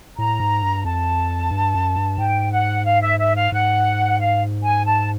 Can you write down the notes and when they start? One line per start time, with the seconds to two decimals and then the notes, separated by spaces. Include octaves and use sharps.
0.17 A2 A#5
0.40 G#2
0.62 G2
0.84 F2 A5
1.51 G2
1.74 F#2
1.96 G2
2.18 G#2 G5
2.52 F#5
2.85 F5
3.02 E5
3.19 E5
3.35 F5
3.52 G#2 F#5
4.19 F5
4.63 G#5
4.85 A5